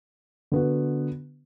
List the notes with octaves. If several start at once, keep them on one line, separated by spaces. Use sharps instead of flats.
D3 B3 F#4